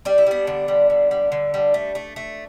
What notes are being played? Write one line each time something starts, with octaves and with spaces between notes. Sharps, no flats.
G3 D4
E4
G3 B3 D4
D3
G3
D3
G3
D3
G3
A3
A3
A3